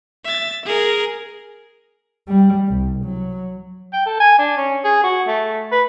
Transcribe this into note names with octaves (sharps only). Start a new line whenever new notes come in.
E5 A6
G#4 A#4
G3
C2
F#3
G5
A4
G#5
D4
C#4
G#4
F#4
A3
B4